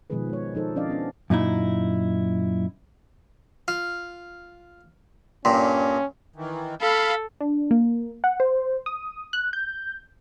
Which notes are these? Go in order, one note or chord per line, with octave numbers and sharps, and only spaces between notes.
B2 D#3 F3 G#3 G#4 B4
G#3 C#5
F3 D#4 A4 C5
F3 C#4 D4 D5 D#5 F5
B3 C#4 D4
F#2 A#2 D#4 E4
F4 F6
G2 A#2 C#4 G5 C6
D#3 E3
A4 F5 B5
D4
A#3
F#5
C5
D#6
F#6
G6